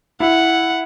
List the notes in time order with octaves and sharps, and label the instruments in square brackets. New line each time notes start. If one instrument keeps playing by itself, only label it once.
[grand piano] E4 [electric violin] F#5